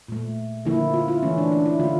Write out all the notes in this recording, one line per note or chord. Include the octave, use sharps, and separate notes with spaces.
A#2 A3
D3 F3 A#3 E4
F4
E4
E3 A3 C#4
D4
D4
E4
D3 A3 F4